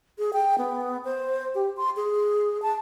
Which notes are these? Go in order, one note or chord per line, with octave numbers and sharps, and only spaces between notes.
G#4
G5
B3
C5
G4
C6
G#4
A5